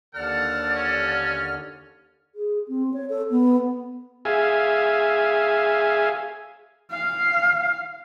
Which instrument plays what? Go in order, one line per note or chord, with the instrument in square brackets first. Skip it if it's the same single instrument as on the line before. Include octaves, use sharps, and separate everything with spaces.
[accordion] D#2 D3 F6 [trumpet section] A4 F#5 A5 [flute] D5
[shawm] C#4
[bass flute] G#4
C4
C#5
A4
B3
[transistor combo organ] G#4 E5 F5 G#5
[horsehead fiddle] F5